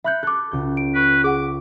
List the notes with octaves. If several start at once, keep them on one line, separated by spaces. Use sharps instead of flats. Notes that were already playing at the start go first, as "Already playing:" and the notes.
E5 B5 F#6 G6 C#7
A4 D6 F#6 G6
C#2 G6
D7
B4 C#6
G#4 F#5 D6